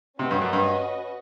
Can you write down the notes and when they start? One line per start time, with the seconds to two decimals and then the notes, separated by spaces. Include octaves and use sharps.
0.19 C3 C#4 F#4 B4 D#5
0.31 G2
0.41 F#2
0.53 G2